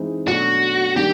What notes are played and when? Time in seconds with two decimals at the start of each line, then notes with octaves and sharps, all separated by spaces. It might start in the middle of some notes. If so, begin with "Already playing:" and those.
Already playing: E3 G#3 C4 D#4
0.28 B2 F#3 A3 D4 F#4
0.96 D#3 G3 A#3 D4 G4